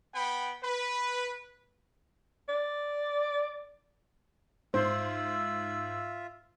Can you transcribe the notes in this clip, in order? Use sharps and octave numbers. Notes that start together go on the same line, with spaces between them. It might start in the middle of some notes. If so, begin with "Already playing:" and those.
B3 F#5 G5 B5
B4
D5
G#2 F4 C5 E5 E6